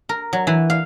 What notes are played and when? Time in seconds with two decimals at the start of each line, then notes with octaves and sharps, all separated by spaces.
0.09 A#4
0.33 F#3
0.47 E3
0.70 F5